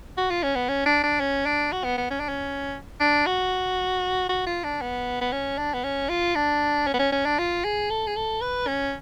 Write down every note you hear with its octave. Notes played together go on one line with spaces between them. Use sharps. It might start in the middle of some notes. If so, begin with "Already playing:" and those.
F#4
F4
C#4
B3
C#4
D4
D4
C#4
D4
F#4
B3
B3
C#4
D4
C#4
D4
F#4
F#4
F4
D4
B3
B3
C#4
D4
B3
C#4
F4
D4
C#4
B3
C#4
C#4
D4
F4
G#4
A4
G#4
A4
B4
C#4